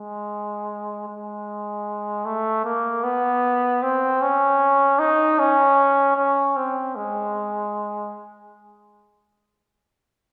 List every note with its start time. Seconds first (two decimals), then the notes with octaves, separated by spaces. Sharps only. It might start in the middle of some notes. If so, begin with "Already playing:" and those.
Already playing: G#3
1.08 G#3
2.25 A3
2.65 A#3
3.04 B3
3.83 C4
4.22 C#4
4.99 D#4
5.39 C#4
6.17 C#4
6.56 C4
6.96 G#3